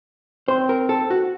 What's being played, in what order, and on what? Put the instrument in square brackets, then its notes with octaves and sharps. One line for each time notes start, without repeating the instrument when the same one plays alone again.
[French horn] C4 [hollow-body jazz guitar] C5
[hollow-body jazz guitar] A#4
A4
F#4